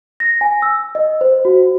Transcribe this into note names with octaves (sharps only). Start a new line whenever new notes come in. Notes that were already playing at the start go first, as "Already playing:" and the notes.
A#6
G#5
E6
D#5
C5
F#4